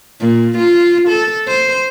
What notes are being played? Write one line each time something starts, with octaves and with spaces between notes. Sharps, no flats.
A#2
F4
A4
C5